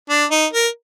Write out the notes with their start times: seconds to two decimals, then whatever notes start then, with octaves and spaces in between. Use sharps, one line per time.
0.10 D4
0.31 D#4
0.53 A#4